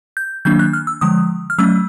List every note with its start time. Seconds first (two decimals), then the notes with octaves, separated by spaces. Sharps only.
0.17 G6
0.45 D#3 F#3 A#3 D4 G6
0.59 F#6
0.73 F6
0.87 E6
1.01 D3 F3 G#3 D#6
1.50 F6
1.58 F#3 A3 C#4 E6